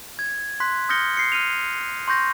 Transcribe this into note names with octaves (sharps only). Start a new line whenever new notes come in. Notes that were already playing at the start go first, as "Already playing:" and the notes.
G#6
C6 F#6 B6
D#6 F6 G6 A#6 C#7 G7
C7 C#7
F6 D#7 F7
C6 C#6 G6 A#6